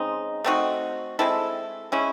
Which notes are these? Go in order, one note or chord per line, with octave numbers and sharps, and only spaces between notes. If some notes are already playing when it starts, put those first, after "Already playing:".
Already playing: C#3 G#3 C4 D#4
A3 C4 D#4 F#4
G#3 C4 E4 A4
C#3 G#3 C#4 E4